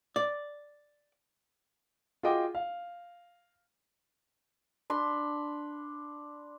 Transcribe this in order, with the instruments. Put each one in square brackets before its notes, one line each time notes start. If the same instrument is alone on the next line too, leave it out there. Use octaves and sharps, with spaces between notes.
[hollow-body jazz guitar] D5
[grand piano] F4 F#4 G#4 D#5 G5 D6
F5
[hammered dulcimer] D4 B5 C6